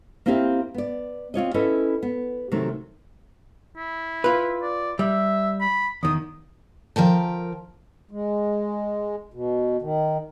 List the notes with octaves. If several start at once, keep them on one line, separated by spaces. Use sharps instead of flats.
A#3 C4 E4 G4 E5 F5
B3 D5
C4 F4 C#5 D#5
C#4 E4 A4 B4 D#5
B3
C3 D#3 F#3 A3
E4
F4 B4
D5
G3 E5
B5
E2 D#3 D#6
F3 A#4 G5 A5
G#3
B2
D#3